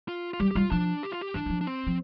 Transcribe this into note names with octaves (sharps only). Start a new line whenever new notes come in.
F4
F4
G3 G4
G4
G3 F4
F3 D4
G4
F4
G4
E3 D4
E3
F3
D4
C4
F3